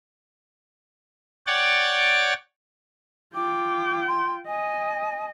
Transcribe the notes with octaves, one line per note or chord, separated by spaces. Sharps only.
C#5 D5 F#5 G5 A6
F4 G5 D6
C6
D#5 G#5